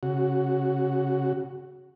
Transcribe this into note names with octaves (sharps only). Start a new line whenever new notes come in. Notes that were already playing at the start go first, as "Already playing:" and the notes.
C#3 F#4